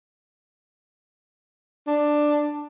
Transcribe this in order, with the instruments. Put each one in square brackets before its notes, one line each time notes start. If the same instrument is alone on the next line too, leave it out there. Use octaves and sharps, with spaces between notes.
[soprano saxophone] D4